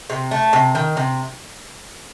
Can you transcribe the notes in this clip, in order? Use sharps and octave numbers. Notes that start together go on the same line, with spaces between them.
C3
A3
C3
D#3
C3